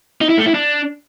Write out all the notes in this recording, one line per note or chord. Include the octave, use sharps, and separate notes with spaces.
D#4
E4
A3
E4
D4